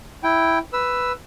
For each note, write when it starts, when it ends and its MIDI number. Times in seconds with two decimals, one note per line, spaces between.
0.23 0.58 64
0.23 0.58 79
0.73 1.12 71
0.73 1.12 88